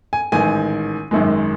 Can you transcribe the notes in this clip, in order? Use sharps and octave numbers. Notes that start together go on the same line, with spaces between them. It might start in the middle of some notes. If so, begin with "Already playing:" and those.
G#5
A1 G#2 D#3 G#5
G#1 F#2 D#3 G#3